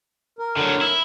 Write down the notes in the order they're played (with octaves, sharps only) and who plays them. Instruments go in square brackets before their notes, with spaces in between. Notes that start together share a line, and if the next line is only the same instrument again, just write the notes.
[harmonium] A#4
[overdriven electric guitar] D3 F#3
E4